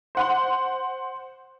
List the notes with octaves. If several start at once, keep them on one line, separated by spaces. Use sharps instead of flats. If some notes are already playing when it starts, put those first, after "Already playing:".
C5 F#5 C6